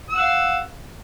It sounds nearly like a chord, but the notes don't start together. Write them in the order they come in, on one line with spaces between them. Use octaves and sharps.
E6 F#5 F5